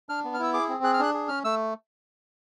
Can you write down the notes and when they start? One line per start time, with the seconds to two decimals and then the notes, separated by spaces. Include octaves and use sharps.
0.09 D4 F6
0.24 B3
0.34 F6
0.39 E4 E6
0.54 G#4 D6
0.69 C4
0.83 G#4 F#6
0.94 F6
0.99 D4 F#6
1.14 G#4
1.28 C#4 F6
1.44 A3 E6